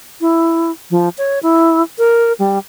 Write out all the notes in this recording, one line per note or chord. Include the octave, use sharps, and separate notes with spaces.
E4
F3
C#5
E4
A#4
G3